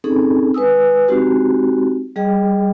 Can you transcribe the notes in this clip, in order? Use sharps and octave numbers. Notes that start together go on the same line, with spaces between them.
C4 C#4 D#4 G#4 A4
G#3 B4 G#5 D#6 E6
G#3 C4 D#4 F#4 G4
G3 G#4 D#5 G5